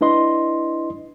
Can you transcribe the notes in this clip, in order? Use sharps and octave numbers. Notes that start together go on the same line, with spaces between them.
D4 E4 B4 D#5 C6